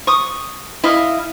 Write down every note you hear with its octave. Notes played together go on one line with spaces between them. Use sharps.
C#6 D#6
E4 D#5 F5